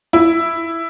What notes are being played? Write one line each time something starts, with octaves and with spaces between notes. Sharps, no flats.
E4